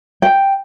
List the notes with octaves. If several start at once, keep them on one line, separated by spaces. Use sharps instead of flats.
G5